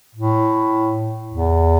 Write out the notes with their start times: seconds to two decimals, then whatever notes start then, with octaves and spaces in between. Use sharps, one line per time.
0.15 A2
1.32 E2